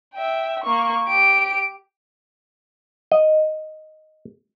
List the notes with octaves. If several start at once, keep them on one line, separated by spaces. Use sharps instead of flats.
E5 G5
A#3 C#6
G4 D7
D#5